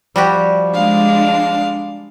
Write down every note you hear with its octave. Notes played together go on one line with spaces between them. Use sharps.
F3 G3 F#4 G4
G#3 D4 F5